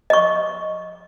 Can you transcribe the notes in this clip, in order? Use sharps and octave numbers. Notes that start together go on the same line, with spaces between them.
D#5 C#6